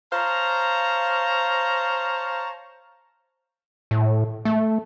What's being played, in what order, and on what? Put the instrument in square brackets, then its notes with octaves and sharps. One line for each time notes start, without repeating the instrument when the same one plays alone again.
[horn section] C5 C#5 F5 A5 A#5
[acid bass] A2
A3